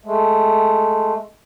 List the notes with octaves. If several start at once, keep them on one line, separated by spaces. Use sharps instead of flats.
G#3 A3